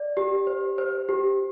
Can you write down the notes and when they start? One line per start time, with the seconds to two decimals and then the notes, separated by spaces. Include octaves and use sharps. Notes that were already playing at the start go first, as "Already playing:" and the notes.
Already playing: D5
0.17 G4
0.47 C5
0.78 C5
1.09 G4